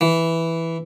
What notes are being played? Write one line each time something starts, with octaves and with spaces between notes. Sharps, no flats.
E3